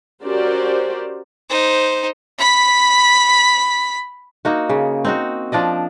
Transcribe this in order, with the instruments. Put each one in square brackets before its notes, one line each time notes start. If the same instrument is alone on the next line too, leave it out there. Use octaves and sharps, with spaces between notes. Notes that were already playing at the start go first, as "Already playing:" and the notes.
[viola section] C#4 F#4 G4 A#4 C5 D5
[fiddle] D#4 C5
[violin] B5 B6
[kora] A#3 D#4 F#4
C#3
C4 D#4 F#4
F3 D4 D5 D#5